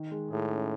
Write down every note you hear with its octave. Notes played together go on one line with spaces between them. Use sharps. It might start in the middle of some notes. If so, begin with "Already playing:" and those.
Already playing: D#3
G#3
A2 G#4
C#4